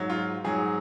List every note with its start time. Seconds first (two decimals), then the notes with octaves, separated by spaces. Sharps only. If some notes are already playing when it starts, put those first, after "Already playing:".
Already playing: G#2 F#3
0.10 F4
0.44 G#2 F#3 G#4